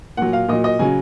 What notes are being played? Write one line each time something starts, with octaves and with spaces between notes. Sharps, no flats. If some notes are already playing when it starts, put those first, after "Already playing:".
A#2 F#3 F#5
F5
A#2 F#3 D#5
D#5
C#3 F#3 G#5